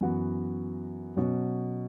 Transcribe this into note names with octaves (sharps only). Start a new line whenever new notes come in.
F#2 E3 B3 F#4
B2 F#3 C#4 F#4